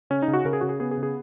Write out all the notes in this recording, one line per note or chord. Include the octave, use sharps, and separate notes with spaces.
C#3 C#4
D#4
C#3
F#4
C#3 A#4
G#4
C#3 F#4
G#4
B3 G#4
G#4
C#3
G#4